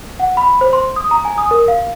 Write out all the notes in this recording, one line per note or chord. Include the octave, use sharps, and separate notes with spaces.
F#5
B5
C5
C6
D#6
A#5
G#5
D#6
A#4
F5